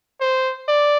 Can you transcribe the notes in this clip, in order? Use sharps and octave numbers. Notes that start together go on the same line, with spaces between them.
C5
D5